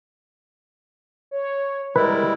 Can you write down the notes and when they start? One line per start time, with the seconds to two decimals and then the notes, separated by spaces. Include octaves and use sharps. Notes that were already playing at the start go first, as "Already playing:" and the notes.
1.31 C#5
1.96 G3 G#3 E4 A#4 B4